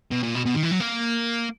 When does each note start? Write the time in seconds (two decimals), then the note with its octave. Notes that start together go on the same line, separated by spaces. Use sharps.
0.11 B2
0.23 A#2
0.35 B2
0.46 B2
0.54 D#3
0.63 E3
0.71 F#3
0.80 A#3